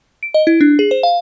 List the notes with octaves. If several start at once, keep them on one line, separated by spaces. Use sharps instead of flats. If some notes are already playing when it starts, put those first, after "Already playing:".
D7
D#5
E4
D4
G#4
C5
F5